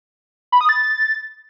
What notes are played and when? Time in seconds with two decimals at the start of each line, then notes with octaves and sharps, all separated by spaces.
0.52 B5
0.61 D#6
0.69 A6